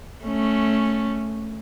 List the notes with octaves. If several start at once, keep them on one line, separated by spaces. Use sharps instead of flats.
A3 C#4